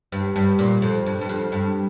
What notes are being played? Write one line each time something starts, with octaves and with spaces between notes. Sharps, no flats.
G2
G2
A#2
F2
G2
G2
F2
G2